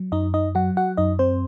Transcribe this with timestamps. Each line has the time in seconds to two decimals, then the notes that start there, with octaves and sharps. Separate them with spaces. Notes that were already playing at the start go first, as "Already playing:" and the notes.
Already playing: F#3
0.12 F#2 D#4 D#5
0.34 D#4 D#5
0.55 F#3 F#4 F#5
0.77 F#4 F#5
0.97 F#2 D#4 D#5
1.19 C4 C5